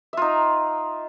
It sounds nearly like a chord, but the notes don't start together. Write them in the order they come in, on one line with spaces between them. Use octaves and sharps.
E5 F4 D#4